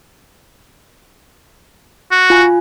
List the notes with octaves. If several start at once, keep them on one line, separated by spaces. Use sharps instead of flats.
F#4
F4 G#5